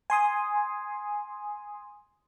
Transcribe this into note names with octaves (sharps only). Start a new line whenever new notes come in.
G#5 C6 D#6